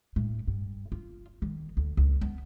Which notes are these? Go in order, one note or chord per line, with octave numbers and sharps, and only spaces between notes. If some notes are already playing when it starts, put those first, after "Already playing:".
A2
G2
F4
D#3
D2
C#2
B3